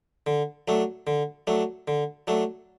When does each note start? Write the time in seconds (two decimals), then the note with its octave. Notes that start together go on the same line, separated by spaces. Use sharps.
0.26 D3
0.68 F#3 A3 D4
1.07 D3
1.47 F#3 A3 D4
1.88 D3
2.27 F#3 A3 D4